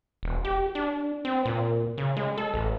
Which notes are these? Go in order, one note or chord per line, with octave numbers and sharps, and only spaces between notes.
E1
G4
D4
C4
A#2
C#3
G#3
A4
A1